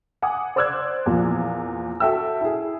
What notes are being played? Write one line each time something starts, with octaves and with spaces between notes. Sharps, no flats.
F#5 G#5 D6 D#6
C5 D5 D6 E6 F#6 G#6
E2 A#2 F3
F#4 A4 E5 G5 E6
E4 G#4